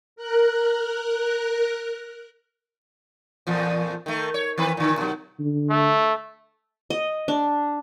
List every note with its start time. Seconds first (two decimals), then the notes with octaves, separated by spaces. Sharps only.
0.16 A#4 F#6
3.47 E2 A#2 F3
4.06 D#3 A3
4.34 C#5
4.58 D#3 C4 B4
4.77 A#2 D3
4.98 B2 F#3
5.40 D3
5.70 A3
6.90 D#5
7.28 D4